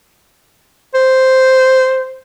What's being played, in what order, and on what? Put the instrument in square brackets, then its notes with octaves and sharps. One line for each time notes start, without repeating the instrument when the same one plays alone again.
[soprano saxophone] C5